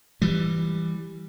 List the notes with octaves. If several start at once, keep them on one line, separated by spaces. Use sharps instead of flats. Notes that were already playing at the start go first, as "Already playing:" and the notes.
E3 G3